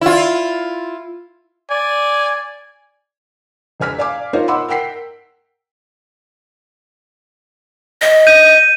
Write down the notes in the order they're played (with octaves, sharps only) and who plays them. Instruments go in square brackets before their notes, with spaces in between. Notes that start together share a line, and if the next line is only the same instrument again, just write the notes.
[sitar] E4 F4
[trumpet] D5 [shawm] G#5
[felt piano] E1 C5 G#5 F6 B6
D5 F5 G#5 D6
D#4 F4 A#4 C5 C#5
D#5 F#5 B5 C6 D6 E6
A#4 F#5 G5 B6 C7
[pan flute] D#5
[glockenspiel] G6 D#7